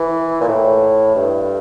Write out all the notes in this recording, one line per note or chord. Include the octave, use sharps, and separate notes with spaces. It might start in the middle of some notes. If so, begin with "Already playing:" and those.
Already playing: E3
A#2
A2
G2